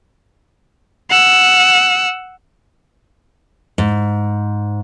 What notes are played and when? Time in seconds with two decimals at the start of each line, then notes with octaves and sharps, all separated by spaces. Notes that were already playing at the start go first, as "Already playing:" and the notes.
1.10 F#5 E6
3.78 G#2